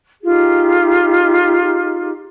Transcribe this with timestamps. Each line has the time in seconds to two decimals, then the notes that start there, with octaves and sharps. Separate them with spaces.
0.22 D#4 F4 G4 G#4